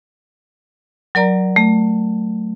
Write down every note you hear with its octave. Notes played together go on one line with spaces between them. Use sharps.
F#3 A#4 D5 A#5
A3